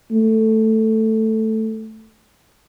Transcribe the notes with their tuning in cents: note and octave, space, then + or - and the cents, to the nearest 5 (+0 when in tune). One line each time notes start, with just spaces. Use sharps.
A3 +5